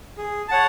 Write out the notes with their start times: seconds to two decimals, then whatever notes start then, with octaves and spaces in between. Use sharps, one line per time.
0.18 G#4
0.48 C#5 F#5 A5